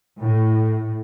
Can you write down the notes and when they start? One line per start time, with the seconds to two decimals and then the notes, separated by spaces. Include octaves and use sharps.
0.20 A2